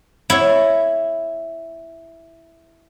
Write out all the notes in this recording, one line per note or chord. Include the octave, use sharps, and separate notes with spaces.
E4 C#5